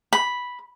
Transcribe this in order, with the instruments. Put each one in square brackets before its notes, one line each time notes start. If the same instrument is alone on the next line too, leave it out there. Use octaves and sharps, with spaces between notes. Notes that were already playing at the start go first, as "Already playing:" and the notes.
[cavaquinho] B5